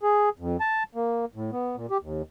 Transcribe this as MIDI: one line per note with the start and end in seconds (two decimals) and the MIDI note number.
0.03 0.29 68
0.39 0.57 41
0.60 0.83 81
0.95 1.25 58
1.35 1.51 45
1.52 1.76 59
1.76 1.86 46
1.90 1.98 67
2.02 2.22 39